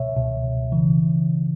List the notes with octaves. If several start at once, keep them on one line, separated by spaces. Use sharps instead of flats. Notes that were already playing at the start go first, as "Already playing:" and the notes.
Already playing: C#2 B2 C#5 E5
C#2 B2
C#3 E3